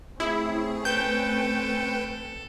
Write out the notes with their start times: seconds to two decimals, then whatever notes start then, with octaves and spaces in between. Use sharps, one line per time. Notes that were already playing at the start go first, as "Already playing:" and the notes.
0.20 A3 C4 C#4 E4 G#4
0.85 A4 B4 G5 G6